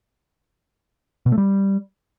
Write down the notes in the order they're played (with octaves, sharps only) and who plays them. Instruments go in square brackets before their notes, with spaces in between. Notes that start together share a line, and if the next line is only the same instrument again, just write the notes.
[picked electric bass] B2
A3
G3